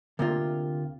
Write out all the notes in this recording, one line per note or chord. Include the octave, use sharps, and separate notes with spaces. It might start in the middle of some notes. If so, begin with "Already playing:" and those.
D2 C3 A#3 F4